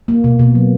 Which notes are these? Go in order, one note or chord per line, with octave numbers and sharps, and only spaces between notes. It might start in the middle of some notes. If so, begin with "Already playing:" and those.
A#3
B2
B2
F#3